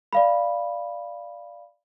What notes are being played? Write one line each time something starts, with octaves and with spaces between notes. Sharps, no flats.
D5 F5 B5